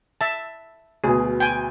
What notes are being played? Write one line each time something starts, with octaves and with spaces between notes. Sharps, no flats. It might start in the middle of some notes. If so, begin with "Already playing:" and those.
E5 A5
D2 B2 G#4
G5 G#5